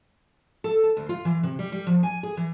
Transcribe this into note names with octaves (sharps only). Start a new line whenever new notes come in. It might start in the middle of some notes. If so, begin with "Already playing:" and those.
A4
A5
D2
F4
E3
C3
G3
G3
F3
G#5
G#4
E3